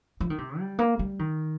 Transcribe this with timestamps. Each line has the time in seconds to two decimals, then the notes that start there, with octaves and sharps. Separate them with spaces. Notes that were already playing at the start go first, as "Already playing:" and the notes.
0.20 F3
0.30 D#3
0.38 C3
0.59 G3
0.79 A#3
0.99 G3
1.19 D#3